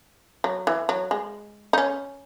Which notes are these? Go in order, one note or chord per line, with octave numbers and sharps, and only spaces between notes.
F#3
E3
F#3
G#3
D#4
C#4